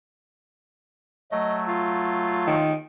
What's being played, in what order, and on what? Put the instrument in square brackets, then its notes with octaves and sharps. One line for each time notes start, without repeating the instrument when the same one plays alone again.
[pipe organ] F#3 A3 [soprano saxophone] D#5
[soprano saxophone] F4
[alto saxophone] D#3